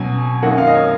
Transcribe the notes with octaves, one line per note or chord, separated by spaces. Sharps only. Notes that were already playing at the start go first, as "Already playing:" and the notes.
Already playing: B2 F#3 C#4 G#5
F#2 D#3 F#3 A#3 C#4 F#5
F5
D#5
C#5